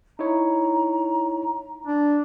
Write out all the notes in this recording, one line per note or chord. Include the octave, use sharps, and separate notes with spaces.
D#4 E4 C#5 A#5
D4